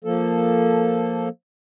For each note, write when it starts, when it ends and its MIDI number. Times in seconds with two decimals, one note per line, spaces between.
0.04 1.29 53
0.04 1.29 58
0.04 1.29 69